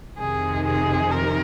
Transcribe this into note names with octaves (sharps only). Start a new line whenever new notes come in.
F2 C3 D#3 G#4
G#4
A#4